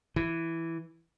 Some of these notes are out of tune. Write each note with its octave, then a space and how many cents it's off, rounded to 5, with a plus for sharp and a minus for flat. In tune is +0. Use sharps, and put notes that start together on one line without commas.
E3 +5